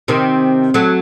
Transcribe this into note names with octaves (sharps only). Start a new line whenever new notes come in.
C3 D#3
F#3 A3